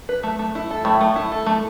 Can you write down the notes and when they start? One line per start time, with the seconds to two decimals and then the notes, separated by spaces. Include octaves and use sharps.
0.09 B4
0.23 A3
0.39 A3
0.55 E4
0.70 A4
0.85 A2 A3
1.01 A3
1.16 E4
1.32 A4
1.46 A3